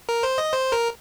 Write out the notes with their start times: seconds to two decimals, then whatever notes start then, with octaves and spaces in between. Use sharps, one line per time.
0.09 A#4
0.23 C5
0.38 D#5
0.53 C5
0.72 A#4